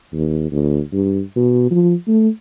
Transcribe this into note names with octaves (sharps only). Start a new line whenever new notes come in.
D#2
D2
G2
B2
F3
A3